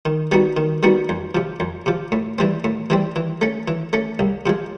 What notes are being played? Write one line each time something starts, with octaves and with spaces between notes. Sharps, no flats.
D#3
G3 B3 D#4 F#4
D#3
G3 B3 D#4 F#4
F2
C3 F3
F2
C3 F3
A2
E3 G3 C4
A2
E3 G3 C4
E3
A3 C#4
E3
A3 C#4
C2
C3 F3 G#3